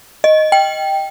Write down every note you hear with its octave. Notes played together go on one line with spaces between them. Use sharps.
D#5
G5